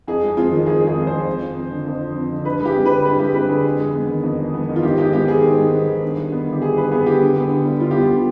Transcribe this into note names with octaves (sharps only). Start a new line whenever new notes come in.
F2 G#4
G#3
C4 F4
D#3
F2 G#4
G#3 G#4
C4
D#3 C5
F2
F3
C4
D3
F2
F3
C4
D3
G2 B4
G#3 G4
C4
D3 B4
G2 B4
G#3 G4
C4 B4
D3 G#4
F2
G#3
B3
D#3
F2
G#3
B3
D#3
F4
G#2 G4
G#3 G4
B3 G4
D#3 G#4
G#2
G#3
B3
D#3
G2
G3
B3
D3
G4
G2 G#4
G3 B4
B3 G#4
D3 G4
D3
B3
D3
G3
D3 F4
G4
B3 F4
D3